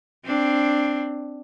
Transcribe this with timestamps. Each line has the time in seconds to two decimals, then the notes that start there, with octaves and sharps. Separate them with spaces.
0.25 C4 D4